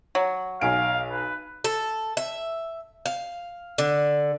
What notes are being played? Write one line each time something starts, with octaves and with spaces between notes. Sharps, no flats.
F#3
B1 F5 G#5 D7
B4
A4
E5
F5
D3